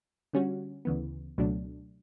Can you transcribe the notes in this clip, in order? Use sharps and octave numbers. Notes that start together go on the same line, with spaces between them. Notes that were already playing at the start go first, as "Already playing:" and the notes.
D3 G3 C#4 F#4
D2 C#3 E3 B3
C#2 B2 F#3 A3 D4